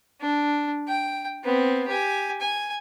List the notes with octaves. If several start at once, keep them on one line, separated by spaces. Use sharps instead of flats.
D4
G5
B3 C4
G4 G#5
G#5